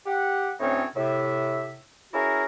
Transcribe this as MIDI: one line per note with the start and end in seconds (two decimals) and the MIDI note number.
0.06 0.51 67
0.06 0.51 78
0.60 0.85 38
0.60 0.85 45
0.60 0.85 60
0.60 0.85 61
0.60 0.85 63
0.60 0.85 73
0.96 1.78 45
0.96 1.78 48
0.96 1.78 76
2.14 2.44 61
2.14 2.44 64
2.14 2.44 66
2.14 2.44 68
2.14 2.44 70